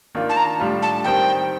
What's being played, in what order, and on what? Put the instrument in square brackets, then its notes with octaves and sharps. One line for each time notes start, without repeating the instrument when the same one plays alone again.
[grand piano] D#3 A#3 D4 F4
[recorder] A5
A#5
[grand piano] A2 G3 D4 F4
[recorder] A5
[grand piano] D#3 G3 C4 D#4 [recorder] G5